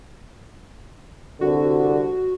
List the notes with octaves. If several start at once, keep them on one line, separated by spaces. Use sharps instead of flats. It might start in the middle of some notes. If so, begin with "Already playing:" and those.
C2 D3 F#4